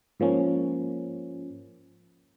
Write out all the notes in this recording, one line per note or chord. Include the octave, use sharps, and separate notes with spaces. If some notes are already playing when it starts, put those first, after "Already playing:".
G#2 F3 A#3 C#4